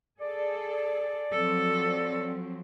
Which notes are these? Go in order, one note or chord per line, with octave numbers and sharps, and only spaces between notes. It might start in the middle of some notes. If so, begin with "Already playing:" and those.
G#4 A4 D5
F3 F#3 C4 A4